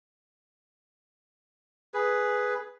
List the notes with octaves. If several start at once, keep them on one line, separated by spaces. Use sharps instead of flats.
G#4 B4